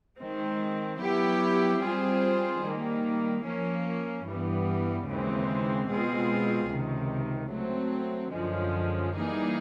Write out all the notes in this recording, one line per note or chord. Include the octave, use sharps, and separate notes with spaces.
D#3 G#3 C4
F#3 B3 E4 G4
G3 C4 F4 G#4 C5
D#3 G3 A#3
F3 A#3 C#4
G2 E3 G3 B3
D#2 C#3 E3 G#3 C4
B2 G#3 C4 F4 G#4
C#2 C3 D#3
F#3 A3 C4
F#2 D3 F3 G#3 C#4
E3 G3 A#3 D#4 G#4